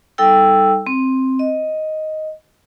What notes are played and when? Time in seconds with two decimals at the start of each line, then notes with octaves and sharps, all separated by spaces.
0.18 G3 D#4 A4 G5 E6
0.87 C4
1.39 D#5